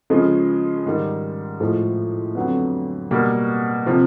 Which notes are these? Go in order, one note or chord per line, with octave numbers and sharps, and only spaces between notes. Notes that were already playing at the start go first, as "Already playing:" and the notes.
C#3 F3 G#3
G#2 D#3 G3
A2 F3 G#3
F2 D3 F#3 B3
B2 G3 A#3
C3 F3